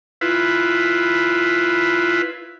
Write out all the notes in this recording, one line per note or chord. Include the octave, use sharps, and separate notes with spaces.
E4 F4 B4